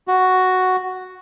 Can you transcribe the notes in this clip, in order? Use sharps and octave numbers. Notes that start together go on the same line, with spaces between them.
F#4